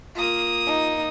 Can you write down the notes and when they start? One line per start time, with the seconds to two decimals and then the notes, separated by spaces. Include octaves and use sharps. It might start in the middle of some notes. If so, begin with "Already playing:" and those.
0.15 A#3 F4 D#6
0.67 D#4